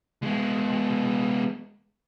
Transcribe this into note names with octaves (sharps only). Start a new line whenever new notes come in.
G#3 B3